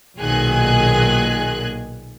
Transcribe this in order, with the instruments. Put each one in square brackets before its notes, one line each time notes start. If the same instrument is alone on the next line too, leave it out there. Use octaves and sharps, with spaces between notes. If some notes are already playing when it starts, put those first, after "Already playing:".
[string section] B1 A#2 D#3 G#4 G#5 F#6